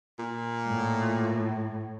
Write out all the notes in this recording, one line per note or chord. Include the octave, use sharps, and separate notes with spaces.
A#2
A2